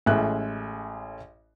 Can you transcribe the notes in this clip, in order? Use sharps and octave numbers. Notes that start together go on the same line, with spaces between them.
A1 G#3 C#4 A4 E5 F#6